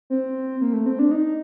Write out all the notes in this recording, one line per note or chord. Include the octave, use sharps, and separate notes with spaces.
C4
A#3
A3
C4
D4
D#4